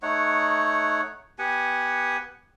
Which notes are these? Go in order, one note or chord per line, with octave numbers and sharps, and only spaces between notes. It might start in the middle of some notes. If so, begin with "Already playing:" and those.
A3 D#4 C#5 F#5
B3 G4 F#5 G#5